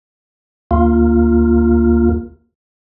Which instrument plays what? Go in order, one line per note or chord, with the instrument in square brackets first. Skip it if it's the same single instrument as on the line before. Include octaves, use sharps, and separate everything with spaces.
[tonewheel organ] D2 A#3 F4